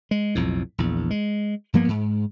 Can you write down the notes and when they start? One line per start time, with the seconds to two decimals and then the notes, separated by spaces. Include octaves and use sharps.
0.11 G#3
0.35 B1 F2 A2
0.78 A#1 E2
1.11 G#3
1.73 G2 F3 A#3 B3
1.88 G#2